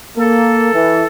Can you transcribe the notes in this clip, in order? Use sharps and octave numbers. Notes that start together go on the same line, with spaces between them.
A#3 A4
E3